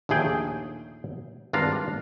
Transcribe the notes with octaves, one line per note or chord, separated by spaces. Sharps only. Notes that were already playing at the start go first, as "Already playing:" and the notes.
A#1 D#2 A3 G#4 G5
G#1 G2 D4 F4 F5 A#5